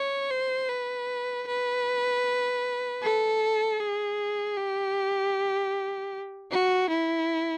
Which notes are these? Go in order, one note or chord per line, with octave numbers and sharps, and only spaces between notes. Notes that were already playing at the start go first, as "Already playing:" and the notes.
Already playing: C#5
C5
B4
B4
A4
G#4
G4
F#4
E4